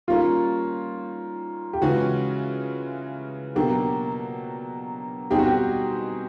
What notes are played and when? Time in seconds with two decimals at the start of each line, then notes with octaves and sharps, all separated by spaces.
0.08 D#3 G3 A#3 C#4 F4
1.73 G4
1.82 C#3 E3 G#3 C#4 F4 F#4
3.56 B2 F#3 A#3 D4 G4
5.30 B2 G3 C4 D#4 G4 G#4
5.39 F#4
5.47 G4